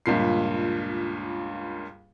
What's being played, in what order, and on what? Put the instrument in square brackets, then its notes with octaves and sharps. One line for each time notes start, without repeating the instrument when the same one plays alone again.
[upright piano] C#2 G2 A#2 C7